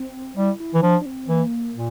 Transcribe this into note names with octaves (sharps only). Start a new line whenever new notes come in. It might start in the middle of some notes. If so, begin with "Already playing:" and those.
Already playing: C4
G3 E4
E4
E3
F3 D4
D4
C4
E3 A#3
A#2